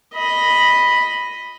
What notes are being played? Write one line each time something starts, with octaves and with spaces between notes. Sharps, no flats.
D#5 B5